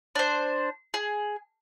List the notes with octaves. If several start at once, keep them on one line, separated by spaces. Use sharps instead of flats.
D4 C5
G#4